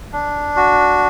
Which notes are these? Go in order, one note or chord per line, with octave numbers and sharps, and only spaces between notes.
D4
F#4